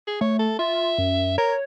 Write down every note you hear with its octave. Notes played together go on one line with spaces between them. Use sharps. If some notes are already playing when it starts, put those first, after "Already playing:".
G#4
A3 C#5
A4
F4 E5
F#2
A#4 C#5